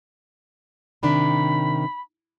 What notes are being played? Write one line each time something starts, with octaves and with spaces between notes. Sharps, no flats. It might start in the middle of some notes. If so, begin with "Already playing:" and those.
C3 D#3 D4 B5